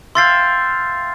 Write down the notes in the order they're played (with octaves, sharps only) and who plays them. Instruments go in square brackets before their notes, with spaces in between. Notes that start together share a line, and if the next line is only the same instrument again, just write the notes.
[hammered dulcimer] E5 F5 G5 [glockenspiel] C6 A6 C7